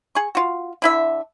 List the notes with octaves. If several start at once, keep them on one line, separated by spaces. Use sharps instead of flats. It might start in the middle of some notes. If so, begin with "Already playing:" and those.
G#4 C#6
F4 F#4
D3 E4 E5